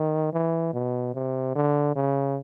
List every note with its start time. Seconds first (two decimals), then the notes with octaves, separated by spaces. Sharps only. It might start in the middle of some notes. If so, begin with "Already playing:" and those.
Already playing: D#3
0.33 E3
0.74 B2
1.14 C3
1.55 D3
1.96 C#3